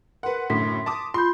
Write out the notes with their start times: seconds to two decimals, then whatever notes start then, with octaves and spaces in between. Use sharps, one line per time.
0.23 A#4 B4 F#5 C6
0.50 F#2 A2 D3 C6 B6
0.86 A5 D6 D#6
1.14 F4 B5 C6 G6